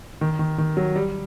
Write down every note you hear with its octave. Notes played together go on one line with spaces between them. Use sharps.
D#3
D#3
D#3
F#3
G3